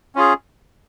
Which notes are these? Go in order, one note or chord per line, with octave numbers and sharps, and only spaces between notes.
C#4 F4 G#4